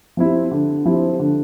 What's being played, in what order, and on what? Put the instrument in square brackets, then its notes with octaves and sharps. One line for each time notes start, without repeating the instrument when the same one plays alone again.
[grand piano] F3 C4 E4 G4
D3
F3 C4 E4 G4
D3